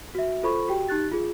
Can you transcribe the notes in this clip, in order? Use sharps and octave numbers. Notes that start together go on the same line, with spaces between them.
F#4 E5
F4 A4 C5 B5 C#6
F#4 G4 G5
D#4 G4 F#6 A6
F4 G#4